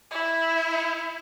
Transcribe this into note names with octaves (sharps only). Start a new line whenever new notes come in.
E4